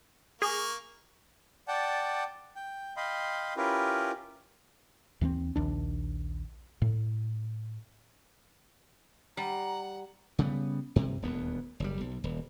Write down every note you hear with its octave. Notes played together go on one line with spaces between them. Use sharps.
A#3 G#4 C#6
D5 F#5 G5 A5
G5
D#5 F5 G5 B5 C6
C#4 E4 F4 G4 A#4 B4
D#2 E3 A#3 C4
A#1 D#2 D4
A2
G3 F#5 A#5
C#3 G3 B3
G2 C3
D#1 D2 B3
F#1 G3
B1
D#1